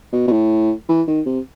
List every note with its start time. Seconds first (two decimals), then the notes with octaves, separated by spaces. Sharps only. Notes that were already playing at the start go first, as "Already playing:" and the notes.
0.13 B2
0.28 B2
0.32 A2
0.89 E3
1.07 D#3
1.26 C3